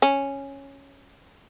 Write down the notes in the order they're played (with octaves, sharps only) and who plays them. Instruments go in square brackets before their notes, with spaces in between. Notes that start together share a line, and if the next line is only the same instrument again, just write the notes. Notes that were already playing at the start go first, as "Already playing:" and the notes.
[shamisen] C#4